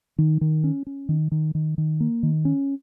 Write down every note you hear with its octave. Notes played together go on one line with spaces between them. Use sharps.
D#3
D#3
C#4
C#4
D#3
D#3
D#3
D#3
A#3
D#3
C#4